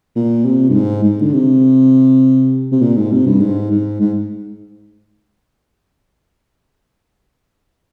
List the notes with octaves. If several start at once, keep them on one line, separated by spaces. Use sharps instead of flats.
A#2
C3
G2
G#2
G#2
D3
C3
C3
A#2
G#2
C3
G2
G#2
G#2
G#2